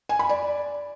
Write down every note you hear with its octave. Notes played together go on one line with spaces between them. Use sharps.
G#5
B5
D5